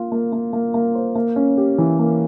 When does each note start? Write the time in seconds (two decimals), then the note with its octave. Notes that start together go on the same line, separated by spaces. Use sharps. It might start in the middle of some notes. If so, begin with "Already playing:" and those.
Already playing: A#3 F4
0.12 A#3
0.32 A#3
0.53 A#3
0.74 A#3
0.95 C5
1.15 A#3
1.36 C#4
1.57 G4
1.78 E3
1.99 A#3